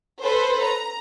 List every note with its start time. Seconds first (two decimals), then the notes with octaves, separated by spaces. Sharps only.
0.21 A4 B4 C5
0.63 A#5